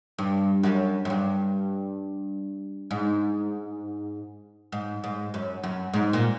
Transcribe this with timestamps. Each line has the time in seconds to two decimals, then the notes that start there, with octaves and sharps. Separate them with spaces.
0.19 G2
0.63 F#2
1.05 F#2
1.10 G2
2.91 G#2
4.72 G#2
5.04 G#2
5.34 F#2
5.63 F#2
5.93 G#2
6.13 A#2